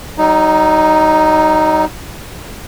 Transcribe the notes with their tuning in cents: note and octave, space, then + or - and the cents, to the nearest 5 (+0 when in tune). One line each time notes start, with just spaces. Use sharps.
F#3 +45 D#4 +0